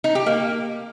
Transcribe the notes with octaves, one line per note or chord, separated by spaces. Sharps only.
D#4
G4
A#3